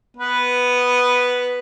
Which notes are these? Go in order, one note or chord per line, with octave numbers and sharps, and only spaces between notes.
B3 B4